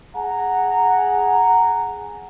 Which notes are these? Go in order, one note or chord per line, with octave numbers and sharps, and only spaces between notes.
G#4 F#5 G#5 A#5